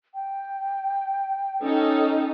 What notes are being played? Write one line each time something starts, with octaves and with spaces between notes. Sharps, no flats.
G5
C#4 D#4 A4